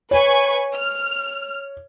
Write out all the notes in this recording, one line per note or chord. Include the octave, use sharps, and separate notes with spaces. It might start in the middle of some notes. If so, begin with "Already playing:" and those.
B4 C#5 G#5 C#6
F6